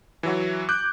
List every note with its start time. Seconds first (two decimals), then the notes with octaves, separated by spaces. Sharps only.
0.23 E3 F#3 F#4
0.69 D6 F#6 G6